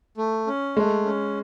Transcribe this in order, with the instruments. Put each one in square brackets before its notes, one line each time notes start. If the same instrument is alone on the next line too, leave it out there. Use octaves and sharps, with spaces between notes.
[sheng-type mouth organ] A3
C#4
[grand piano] G#3 [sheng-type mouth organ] A3
[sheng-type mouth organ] C#4